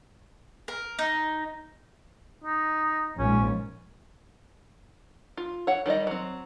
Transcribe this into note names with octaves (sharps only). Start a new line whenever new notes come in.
A#4
D#4
D#4
A#1 G#2 C#4
F4
C#5 F#5
D#3 G3 D5 D#5
F#3 C4